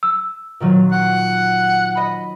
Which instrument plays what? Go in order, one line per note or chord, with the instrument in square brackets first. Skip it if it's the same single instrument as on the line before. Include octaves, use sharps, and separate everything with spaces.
[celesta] E6
[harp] A#2 D#3 F#3
[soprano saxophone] F#5
[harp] D#5 B5